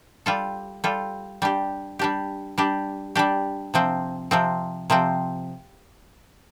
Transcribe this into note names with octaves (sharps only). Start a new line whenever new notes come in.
G3 F4 A4
G3 F4 A4
G3 D4 G4
G3 D4 G4
G3 D4 G4
G3 D4 G4
C3 F3 C4
C3 F3 C4
C3 F3 C4